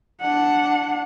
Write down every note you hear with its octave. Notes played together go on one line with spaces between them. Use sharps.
D4 F#5